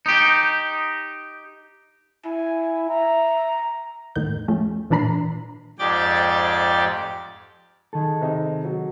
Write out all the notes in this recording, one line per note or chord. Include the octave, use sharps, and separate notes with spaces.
D#4 G4
E4 G#5
E5 A#5
E2 A2 D#3 G6
F3 A3 C#4
A#2 E3 D4 A#5 B5 C7
F2 G#2 G4 D5 G5 A6
D#3 G#4 A4
C3 D#4
F#3